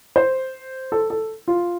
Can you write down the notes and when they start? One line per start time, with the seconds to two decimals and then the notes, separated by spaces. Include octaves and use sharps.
0.16 C5
0.92 A4
1.10 A4
1.48 F4